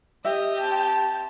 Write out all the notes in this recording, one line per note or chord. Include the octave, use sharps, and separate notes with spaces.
G4 D#5 E5
C4 A5